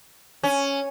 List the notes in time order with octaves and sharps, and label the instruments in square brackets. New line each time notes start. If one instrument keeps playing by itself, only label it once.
[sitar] C#4